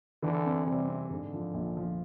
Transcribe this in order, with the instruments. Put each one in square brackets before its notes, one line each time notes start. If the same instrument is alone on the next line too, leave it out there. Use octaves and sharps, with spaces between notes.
[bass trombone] D3 [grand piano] E3
[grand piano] C4
[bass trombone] C3 [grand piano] G3
[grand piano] C4
[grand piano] G#2 [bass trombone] D3
[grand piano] F3
A#1
F3